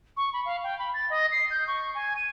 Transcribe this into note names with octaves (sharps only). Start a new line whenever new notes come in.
C#6
B5
F5
G5
B5
A6
D#5
C7
G6
C#6
G#5
D#7